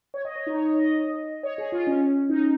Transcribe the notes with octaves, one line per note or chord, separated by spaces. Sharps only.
C#5
D#5
C#5
D#4
C#5
D#5
C#5
G#4
F4
C#4
D#4